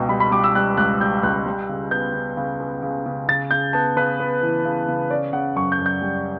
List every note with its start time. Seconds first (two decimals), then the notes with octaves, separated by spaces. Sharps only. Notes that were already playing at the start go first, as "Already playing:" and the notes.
Already playing: C#2 B2 G5
0.09 G3 B5
0.20 B5
0.32 G3 D6
0.44 E6
0.55 G3 F#6
0.77 C#2 F#6
1.00 G3 G6
1.23 C#2 F#6
1.46 G3
1.69 C#3
1.91 B3 G6
2.14 C#3
2.37 C#3
2.60 B3
2.83 C#3
3.06 C#3
3.28 C#3 A6
3.51 C#3 G6
3.73 B3 A5
3.97 C#3 B4
4.20 B3
4.42 E3
4.65 C#3
4.88 C#3
5.10 C#4 D5
5.33 C#3 F#5
5.56 F#2 C#6
5.72 G6
5.79 F#2
5.86 G6
6.02 G3